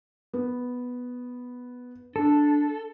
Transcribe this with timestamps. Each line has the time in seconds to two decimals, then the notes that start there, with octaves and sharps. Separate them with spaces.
0.33 B3
2.16 D4 A4